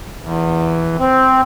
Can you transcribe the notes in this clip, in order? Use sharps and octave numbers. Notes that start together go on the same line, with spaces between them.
E2
C4